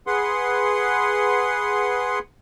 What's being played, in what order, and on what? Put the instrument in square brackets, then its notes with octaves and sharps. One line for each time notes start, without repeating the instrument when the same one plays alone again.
[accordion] G#4 B4 F#5 C6